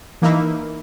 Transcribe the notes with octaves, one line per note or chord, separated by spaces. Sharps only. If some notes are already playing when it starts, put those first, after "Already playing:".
E3 A#3 D#4 E4